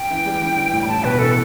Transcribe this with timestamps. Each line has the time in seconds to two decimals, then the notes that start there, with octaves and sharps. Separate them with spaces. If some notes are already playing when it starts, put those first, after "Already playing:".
Already playing: G5
0.11 E3
0.26 G3
0.42 E3
0.56 D3
0.73 A2
0.82 B5
0.88 A2 A5
1.04 B2 B4
1.18 E3 A4